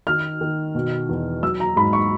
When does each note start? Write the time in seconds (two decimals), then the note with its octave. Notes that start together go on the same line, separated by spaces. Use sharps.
0.07 D#3 F6
0.41 D#3
0.75 B2
1.09 E2
1.42 F#3 E6
1.60 A#5
1.76 G#2 B5
1.93 C#6